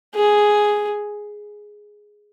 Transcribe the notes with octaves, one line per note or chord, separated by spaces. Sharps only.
G#4